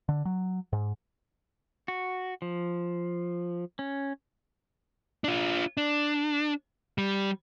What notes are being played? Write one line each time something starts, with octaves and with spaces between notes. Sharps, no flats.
D3
F#3
G#2
F#4
F3
C#4
D4 F4
D4
G3